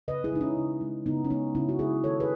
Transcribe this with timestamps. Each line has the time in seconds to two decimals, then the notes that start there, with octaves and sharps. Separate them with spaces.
0.08 C#3 B4 D#5
0.24 E4 G#4
0.32 G#3 D#4
0.41 C#4 E4
0.57 C#3
0.81 G#3
1.06 C#3 B3 D#4
1.25 C#4
1.30 G#3 B3 D#4
1.55 C#3 C#4 E4
1.69 F#4
1.79 G#3 E4 G#4
2.04 D#3 A4 C#5
2.20 G#4 B4